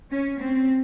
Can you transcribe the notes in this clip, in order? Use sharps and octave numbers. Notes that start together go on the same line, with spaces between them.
C#4
C4